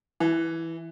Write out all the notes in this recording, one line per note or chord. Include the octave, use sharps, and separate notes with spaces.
E3